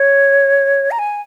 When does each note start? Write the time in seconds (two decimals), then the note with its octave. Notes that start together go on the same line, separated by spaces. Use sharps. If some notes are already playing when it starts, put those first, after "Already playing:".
Already playing: C#5
0.91 A#5
0.99 G#5